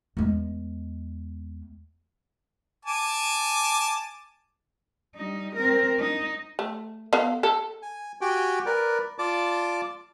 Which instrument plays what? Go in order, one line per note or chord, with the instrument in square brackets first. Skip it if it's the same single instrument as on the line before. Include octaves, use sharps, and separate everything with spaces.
[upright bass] E2 G#3
[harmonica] G#5 A5 D6
[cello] G3 D#4
C4 A#4
D#4
[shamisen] A3
B3 A4 F5
A4
[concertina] G#5
F#4 G4 G5 G#5
A#4 B4 D5
F4 D5 A5 D6